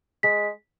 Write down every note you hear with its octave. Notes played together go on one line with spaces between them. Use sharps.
G#3 B6